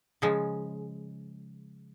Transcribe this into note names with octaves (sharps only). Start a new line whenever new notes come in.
C#3 F3 G#3